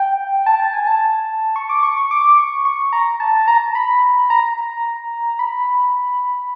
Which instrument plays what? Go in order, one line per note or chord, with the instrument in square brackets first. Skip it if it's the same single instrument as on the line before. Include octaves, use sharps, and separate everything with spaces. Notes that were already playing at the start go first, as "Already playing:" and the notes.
Already playing: [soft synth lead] G5
A5
A5
G#5
A5
C#6
D6
C#6
C#6
D6
C#6
C#6
A#5
A5
A#5
B5
A#5
B5